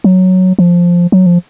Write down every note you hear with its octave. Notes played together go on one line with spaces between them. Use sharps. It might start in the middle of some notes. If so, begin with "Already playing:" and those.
F#3
F3
F#3
F3